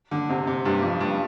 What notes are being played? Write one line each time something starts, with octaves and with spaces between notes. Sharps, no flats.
D3
C3
C3
G2
F2
G2